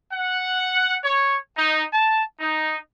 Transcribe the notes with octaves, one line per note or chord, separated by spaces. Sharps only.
F#5
C#5
D#4
A5
D#4